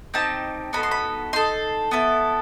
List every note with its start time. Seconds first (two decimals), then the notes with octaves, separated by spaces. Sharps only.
0.14 C4 D#4 G4 A5
0.73 B3 D#4 F#4 A4 B5
0.83 C6
0.91 B5
1.33 D#4 A4 C6
1.91 B3 E4 A4